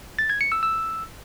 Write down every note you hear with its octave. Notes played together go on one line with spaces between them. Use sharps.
A6
G#6
C#7
E6
E6